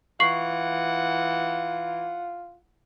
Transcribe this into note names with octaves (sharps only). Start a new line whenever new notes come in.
E3 F4 F#5 C#6 C7 F#7